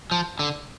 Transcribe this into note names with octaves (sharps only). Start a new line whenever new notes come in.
F3
D3